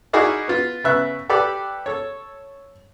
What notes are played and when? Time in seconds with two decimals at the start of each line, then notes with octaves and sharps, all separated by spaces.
0.13 D#4 E4 F#4 G#4 A#4 D5
0.48 B3 F4
0.84 C#3 B3 E5 F#6
1.29 G4 A4 B4 D5
1.86 A4 C#5